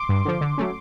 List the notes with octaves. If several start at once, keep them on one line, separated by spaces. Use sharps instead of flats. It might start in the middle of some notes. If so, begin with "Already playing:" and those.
Already playing: C6 D6
G2
D3 F3
D3
F#3 A3 C#4